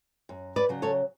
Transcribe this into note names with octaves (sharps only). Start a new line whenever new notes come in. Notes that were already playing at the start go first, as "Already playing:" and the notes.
F#2
B4 D5
C#3 F#3
A4 C#5